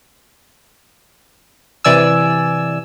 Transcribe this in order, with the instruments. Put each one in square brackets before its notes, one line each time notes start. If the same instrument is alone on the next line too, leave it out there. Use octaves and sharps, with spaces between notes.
[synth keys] C3 E3 D5 G#5 E6